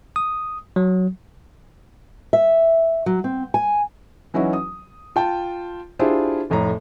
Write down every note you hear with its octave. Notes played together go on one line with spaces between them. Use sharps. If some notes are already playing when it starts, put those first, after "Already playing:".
D#6
F#3
E5
F#3
C4
G#5
E3 F#3 C#4 D#4 E4 F#4
D#6
F4 G5 A5
D4 E4 F4 G4 G#4 C5
F1 F2 A2 C#5 A#5